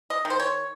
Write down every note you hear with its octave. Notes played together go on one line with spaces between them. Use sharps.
D#5
D#3
C5
C#5